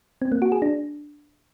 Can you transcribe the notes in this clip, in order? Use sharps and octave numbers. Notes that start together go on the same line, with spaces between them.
C4
A#3
F#4
G#4
D4